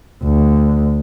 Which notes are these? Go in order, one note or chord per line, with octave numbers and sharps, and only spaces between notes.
D2